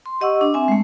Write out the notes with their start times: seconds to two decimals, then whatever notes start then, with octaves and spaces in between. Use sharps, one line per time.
0.06 C6
0.21 G4 D#5 F#5 C#6 E6
0.41 D4
0.54 C4 E5 G#5
0.68 G#3 A3